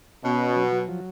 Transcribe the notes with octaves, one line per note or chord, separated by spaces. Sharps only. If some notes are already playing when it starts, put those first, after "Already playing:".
B2 C#4
F#4
F#3
F#3
F3